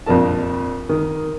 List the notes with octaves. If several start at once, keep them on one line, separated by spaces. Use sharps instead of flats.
A#1 F2 C3 D4 A#4 A5
D#3